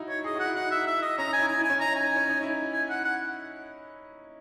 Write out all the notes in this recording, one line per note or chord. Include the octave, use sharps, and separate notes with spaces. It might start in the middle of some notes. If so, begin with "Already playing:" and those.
Already playing: D#4 E4 F#4
C#5
G#4 D#5
F#4 F#5
E4
D#4 F#5
E5
E5
D#5
C#4 A#5
D#4 G#5
E4
G#5
E4
G#5
C#4
D#4 A#5
G#5
C#4
D#4
E4
G#5
F#5
F#5